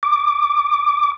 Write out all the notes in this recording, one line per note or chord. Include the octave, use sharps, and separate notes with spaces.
D6